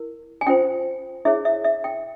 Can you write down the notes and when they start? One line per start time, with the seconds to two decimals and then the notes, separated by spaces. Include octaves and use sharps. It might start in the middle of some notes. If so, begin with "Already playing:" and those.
Already playing: E4 A#4
0.41 G#5
0.47 C#4 F4 C5 G5
1.25 E4 G#4 C#5 E5
1.45 E5
1.64 E5
1.84 G5